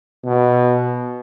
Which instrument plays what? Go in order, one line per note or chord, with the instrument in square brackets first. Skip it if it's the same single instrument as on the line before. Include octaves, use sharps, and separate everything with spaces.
[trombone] B2